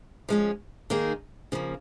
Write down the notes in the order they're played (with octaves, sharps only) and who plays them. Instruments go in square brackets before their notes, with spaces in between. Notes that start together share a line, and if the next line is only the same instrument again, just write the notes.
[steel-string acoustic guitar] F3 G#3 C#4
D#3 A#3 D#4 G#4
C#3 F3 A#3